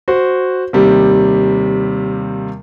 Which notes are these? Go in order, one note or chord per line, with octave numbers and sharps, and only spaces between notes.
F#4 C5
D#2 C3 G3